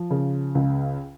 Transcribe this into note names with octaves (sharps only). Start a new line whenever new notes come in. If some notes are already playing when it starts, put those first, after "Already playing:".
Already playing: F3
C#3
C#2